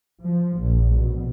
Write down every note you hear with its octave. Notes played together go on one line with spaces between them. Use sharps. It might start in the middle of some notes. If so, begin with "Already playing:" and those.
F3
A#1
B2